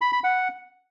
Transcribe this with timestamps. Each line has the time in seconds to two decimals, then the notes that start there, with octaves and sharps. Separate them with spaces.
0.01 B5
0.13 B5
0.24 F#5